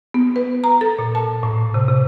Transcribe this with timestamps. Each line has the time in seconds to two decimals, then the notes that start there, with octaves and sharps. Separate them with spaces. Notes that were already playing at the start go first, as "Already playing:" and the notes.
0.14 B3
0.36 B4
0.64 A#5
0.81 A4
0.99 A#2
1.15 A5
1.43 A2
1.74 C3
1.89 C3